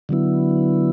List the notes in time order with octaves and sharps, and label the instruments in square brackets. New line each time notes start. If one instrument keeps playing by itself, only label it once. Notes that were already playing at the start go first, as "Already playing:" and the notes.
[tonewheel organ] D3 F#3 B3 E4